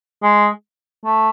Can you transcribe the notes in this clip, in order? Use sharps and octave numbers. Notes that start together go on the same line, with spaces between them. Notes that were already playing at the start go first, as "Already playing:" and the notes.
G#3
A3